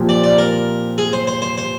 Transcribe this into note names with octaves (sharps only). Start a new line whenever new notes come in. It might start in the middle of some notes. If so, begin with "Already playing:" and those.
Already playing: A#2 F3 C4 G4
D5
D5
A#4
G#4
C5
C5
C5
C5